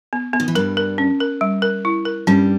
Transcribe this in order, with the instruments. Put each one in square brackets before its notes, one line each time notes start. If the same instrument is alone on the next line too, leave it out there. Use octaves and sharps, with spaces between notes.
[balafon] B3
B3
[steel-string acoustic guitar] D#3
E3
[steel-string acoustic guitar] G2 G3 [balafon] A#4
[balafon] A#4
C#4
A#4
G3
A#4
E4
A#4
[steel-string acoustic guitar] G2 G3 [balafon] C#4